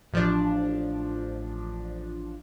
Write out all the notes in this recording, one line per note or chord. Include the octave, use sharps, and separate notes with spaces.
A1 F3 D4